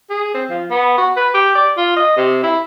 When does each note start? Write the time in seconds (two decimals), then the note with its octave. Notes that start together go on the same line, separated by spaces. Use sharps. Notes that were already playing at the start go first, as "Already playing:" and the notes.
0.10 G#4
0.35 C4
0.50 F3
0.70 B3
0.98 F#4
1.17 B4
1.34 G4
1.55 D5
1.77 F4
1.96 D#5
2.17 C3
2.43 E4